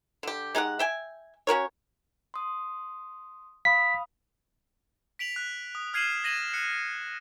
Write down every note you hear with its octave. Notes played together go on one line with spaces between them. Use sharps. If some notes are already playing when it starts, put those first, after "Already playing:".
D3 G4
G#3 D#4 G4 F#5
E5 G5 G#5
C#4 F#4 A#4 C#5
C6 D#6
F5 B5 D#6 B6
B6 D7 F7 F#7
F#6
D#6
F6 G#6 C7 D#7 E7 F#7
G#6 A#6 D#7 E7 F#7
F#6 C#7